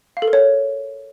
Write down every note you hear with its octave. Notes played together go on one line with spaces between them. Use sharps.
F5
A4
A#4
C#5